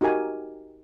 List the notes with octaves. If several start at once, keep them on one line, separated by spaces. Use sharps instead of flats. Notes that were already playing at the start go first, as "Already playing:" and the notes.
D#4 F#4 G4 A#4 G#5